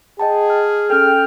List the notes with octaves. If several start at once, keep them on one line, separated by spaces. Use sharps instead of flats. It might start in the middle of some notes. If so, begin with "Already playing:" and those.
G#4 D#5 G5 A5
F6
C#4 A4 G5 F6